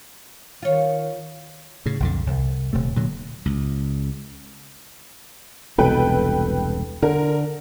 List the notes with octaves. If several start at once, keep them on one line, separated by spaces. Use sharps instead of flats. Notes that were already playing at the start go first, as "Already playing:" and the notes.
D#3 F4 C#5
A2 C#3
B1 F2 D3
C2
D#1 C3 A3
A#2 D3 F#3
C#2
E1 C2 B2 A4 B4 G5
D3 A#4